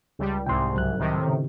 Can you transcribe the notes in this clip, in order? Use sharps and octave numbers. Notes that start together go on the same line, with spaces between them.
C#2 G3
C2 G#2 C3 G5 C6
C#2 F#3 F#6
A2 C3 D#3
C#3